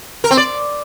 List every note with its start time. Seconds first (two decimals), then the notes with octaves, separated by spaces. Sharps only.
0.24 A#4
0.31 C4
0.37 D5